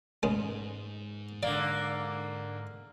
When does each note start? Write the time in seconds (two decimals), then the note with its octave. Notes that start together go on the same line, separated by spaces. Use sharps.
0.23 G#2 G#3 B3 C#4
1.43 D3 A#3 D5